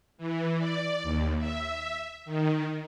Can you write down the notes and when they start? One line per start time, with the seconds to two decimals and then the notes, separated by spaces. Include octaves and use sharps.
0.18 E3
0.59 D5
1.03 D#2
1.38 E5
2.25 D#3